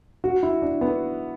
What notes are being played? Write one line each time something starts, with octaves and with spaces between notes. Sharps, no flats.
F#4
E4
D4
B3